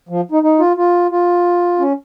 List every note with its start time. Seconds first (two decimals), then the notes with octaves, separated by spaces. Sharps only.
0.09 F3
0.32 D#4
0.43 D#4
0.59 F4
0.77 F4
1.11 F4
1.79 C#4